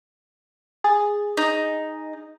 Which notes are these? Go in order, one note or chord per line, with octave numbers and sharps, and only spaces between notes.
G#4 A6
D#4